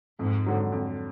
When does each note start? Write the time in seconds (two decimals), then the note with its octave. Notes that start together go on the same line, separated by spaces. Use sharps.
0.19 F2 G#2
0.46 D3 F#3
0.72 F2